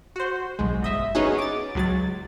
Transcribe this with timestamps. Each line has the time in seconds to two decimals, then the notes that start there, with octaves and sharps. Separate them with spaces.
0.16 F#4 C5
0.59 B1 G#3
0.82 G1 D#5 E5
1.15 B3 C#4 D#4 F#4 G#4
1.38 D6 A6
1.75 C#2 F#3 A6